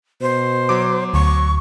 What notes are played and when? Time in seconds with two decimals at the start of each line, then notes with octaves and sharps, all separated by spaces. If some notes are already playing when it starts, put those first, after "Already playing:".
0.21 B2 C5
0.69 F#3 D6
1.14 D2 C#6